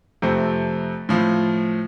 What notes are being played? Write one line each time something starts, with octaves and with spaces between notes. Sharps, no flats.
F2 C3 A3 C4
A2 F3 C4